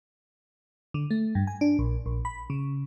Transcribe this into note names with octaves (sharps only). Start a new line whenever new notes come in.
D3
A3
G2
G#5
D4
A#1
A#1
B5
C#3